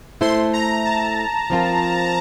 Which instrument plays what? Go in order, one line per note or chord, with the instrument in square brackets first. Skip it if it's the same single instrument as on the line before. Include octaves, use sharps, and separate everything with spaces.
[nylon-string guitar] A3 E4 A4 C5 [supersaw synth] C6
[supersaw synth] A#5
A5
[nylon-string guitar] F3 C4 F4 A#4